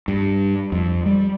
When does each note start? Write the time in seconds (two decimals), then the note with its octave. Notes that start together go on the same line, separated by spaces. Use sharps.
0.08 G2
0.72 F2
1.06 G3